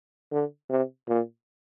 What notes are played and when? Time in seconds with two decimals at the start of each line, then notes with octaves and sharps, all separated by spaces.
0.32 D3
0.70 C3
1.08 A#2